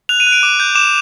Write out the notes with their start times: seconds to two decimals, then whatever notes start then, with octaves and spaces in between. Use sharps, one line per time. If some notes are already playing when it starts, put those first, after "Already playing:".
0.09 F#6 F7
0.20 D#7
0.27 F#6
0.32 D7
0.43 D6
0.60 G6
0.75 D6 E7